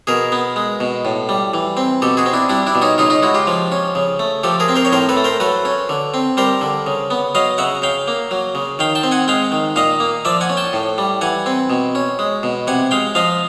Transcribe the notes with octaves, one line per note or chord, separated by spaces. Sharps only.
B2 G#4 A#4
B3
G#3
B2
A2
G3
E3
C4
B2 G4 A4
F#4 G#4
C4
D4 E4
G3 D4 E4
D4 E4
B2
C#4 D#4
C#3 D#4 F4
D#4 F4
G#3 E4 F#4
F4 G4
F3
C#4
C#3
A3
F3 G4 A4
G#4 A#4
C4
A#4 C5
C#5
A2 A#4 C5
A4 B4
A3
A#4 C5
F#3 A4 B4
C#4
D3
C4
G3 A#4 C5
D3
C#3
B3
F#3 D#5 F5
C#3 E5 F#5
C#3 F5 G5
A#3
F#3
C#3
D#3 F5 G5
G5 A5
C4
F#5 G#5
G#3 F5 G5
D#3
A#2 D#5 F5
A#3
F3 D5 E5
F#5 G#5
C#4
G5 A5
A2
G3
E3 F#5 G#5
C4
B2
C#4
G#3
B2
C3 F#5 G#5
G#3 F5 G5
F3 D#5 F5